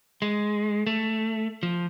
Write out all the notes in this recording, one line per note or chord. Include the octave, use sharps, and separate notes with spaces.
G#3
A3
F3